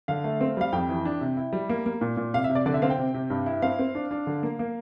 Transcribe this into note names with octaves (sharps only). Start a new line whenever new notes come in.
D3 F5
A3
C4
G3 F5
F2 G5
E3
D4
C3
E4
G3
A#3
A#3
A#2
A#2
C3 F5
E5
C3
D5
D3 D5
E5
C4 F5
G5
C3
C3
G2
E4
C4 F5
C4
D4
D4
D3
A#3
A#3